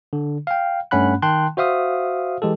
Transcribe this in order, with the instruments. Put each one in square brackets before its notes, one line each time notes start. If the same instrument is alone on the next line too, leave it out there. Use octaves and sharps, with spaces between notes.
[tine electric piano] D3
F5 G5
G2 A3 C#4 F#5 B5 F#6
D#3 G5 A5 C6 F#6
F#4 C5 E5 F5 D#6
E3 G#3 G4 A4